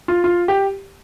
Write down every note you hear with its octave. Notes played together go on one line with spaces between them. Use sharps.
F4
F4
G4